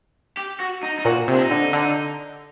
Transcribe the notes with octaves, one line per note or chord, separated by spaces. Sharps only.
G4
F#4
D#4
D#4
A#2 F#4
C3
D4
D#4
D3
D3